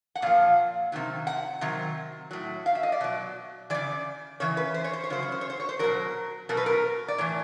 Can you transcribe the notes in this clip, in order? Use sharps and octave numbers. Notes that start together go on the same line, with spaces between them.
F#5
A#2 F3 F5
C3 D#3 F#3
F#5
C3 D#3 F#3
A2 F#3
F5
E5
D#5
D5
B2 F#3
C#3 E3 D5
C#3 E3 C#5
B4
C5
C#5
C5
C#5
C#3 F#3 C5
C#5
C5
C#5
C5
C#5
C5
B2 F#3 A#4
B2 F#3 A#4
B4
A#4
D5
A2 E3 C#5